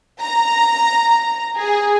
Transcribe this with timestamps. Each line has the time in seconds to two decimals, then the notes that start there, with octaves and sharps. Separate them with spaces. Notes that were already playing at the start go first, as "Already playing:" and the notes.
0.20 A#5
1.57 G#4